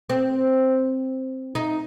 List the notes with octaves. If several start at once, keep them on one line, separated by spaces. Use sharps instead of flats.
C4
D#4